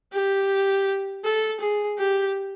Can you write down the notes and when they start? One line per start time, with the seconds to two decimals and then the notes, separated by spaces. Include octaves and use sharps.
0.13 G4
1.25 A4
1.61 G#4
1.99 G4